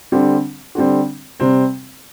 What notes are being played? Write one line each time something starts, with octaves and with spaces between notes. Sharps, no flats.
D3 G3 C4
D3 G3 C4
C3 G3 C4